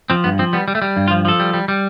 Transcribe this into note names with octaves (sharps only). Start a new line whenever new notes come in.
F3 C4
G2 B3
F3 C4
G3 B3
G3
A3
G3
G2
F4
F3
F3 A4
G3
G3
G3